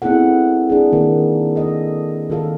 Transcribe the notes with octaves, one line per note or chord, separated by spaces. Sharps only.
B3 C4 E4 G#4 A4 F#5
D4 G#4
D#3 A#3 D#4
A4 D#5
D#3 F4 A4 F5